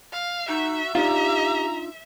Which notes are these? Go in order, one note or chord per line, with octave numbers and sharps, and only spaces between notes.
F5
D#4 F#4 E5
D4 D#4 F4 G4 A#5